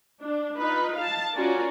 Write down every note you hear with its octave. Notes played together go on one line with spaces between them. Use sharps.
D4
D#4 F4 B4
F5 A5
C#4 F4 F#4 A#4 D5 G#5